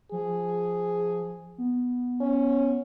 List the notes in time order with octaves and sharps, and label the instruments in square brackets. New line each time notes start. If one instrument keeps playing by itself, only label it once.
[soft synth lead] F3 [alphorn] G#4
[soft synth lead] B3
[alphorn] C#4